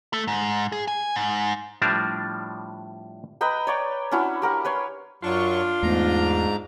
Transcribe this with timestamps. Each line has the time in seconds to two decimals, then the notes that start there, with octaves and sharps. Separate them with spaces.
0.13 A3
0.28 G#2
0.72 G#4
0.88 G#5
1.16 G#2
1.82 A2 F3 G3 D4 A#4 A5
3.41 B4 D#5 G5 A#5
3.67 C#5 D5 G5
4.11 C#4 D4 E4 F#4
4.42 G4 A#4 F#5
4.65 B4 C#5 C6
5.23 F#2 F#3 D4 F4 C#6
5.83 E2 G#2 A3 B3 A#5